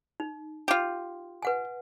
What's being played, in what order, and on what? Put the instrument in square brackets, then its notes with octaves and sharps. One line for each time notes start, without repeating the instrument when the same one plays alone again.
[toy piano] D#4
[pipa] F4 G4
[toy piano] B4 F#5 G#5